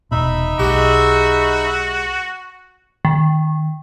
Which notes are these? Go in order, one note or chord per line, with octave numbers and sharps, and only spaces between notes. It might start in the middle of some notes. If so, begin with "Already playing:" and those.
F1 E2 B2 D#4 E5 B5
B1 G#3 F#4 G4
D#3